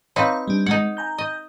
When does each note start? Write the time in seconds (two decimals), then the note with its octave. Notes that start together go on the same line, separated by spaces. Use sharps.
0.16 C4 D#4 B4 C#5 F5 A#5
0.48 G3 D4
0.66 G#3 D#4 F#5
0.97 G#5 A#5 G6
1.18 D#5